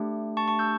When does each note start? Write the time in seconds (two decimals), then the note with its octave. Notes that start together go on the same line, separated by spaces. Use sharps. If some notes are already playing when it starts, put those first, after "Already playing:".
Already playing: A3 D4 G4
0.37 A5 C#6
0.48 A5 C#6
0.59 E6 G6